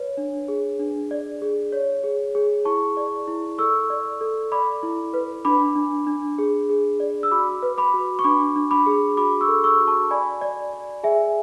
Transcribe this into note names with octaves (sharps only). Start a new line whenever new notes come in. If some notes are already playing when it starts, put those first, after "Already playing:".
Already playing: B4 C#5
D4
G#4
D4
D5
G#4
C#5
G#4
G#4
E4 A5 C#6
D5
E4
A4 C#6 E6
D5
A4
D5 B5 D6
E4
B4
D4 B5 D6
D4
D4
G#4
G#4
D5
E6
F#4 B5 D6
B4
B5 D6
F#4
C#6
D4 B5 D6
D4
B5 D6
G#4
F#4 B5 D6
C#6 E6
A4
C#6 E6
F#4
A5 C#6
D5 G#5 B5
D5
D5
G#4 E5 G#5